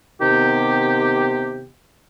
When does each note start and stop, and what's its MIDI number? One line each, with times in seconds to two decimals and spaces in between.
0.21 1.66 48
0.21 1.66 51
0.21 1.66 59
0.21 1.66 67